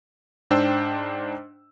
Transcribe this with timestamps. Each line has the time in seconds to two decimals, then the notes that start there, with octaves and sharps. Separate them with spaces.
0.51 G#2 D4 C5 G5 E6